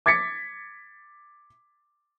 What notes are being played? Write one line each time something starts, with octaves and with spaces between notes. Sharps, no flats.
D6 G#6 A6 B6 C#7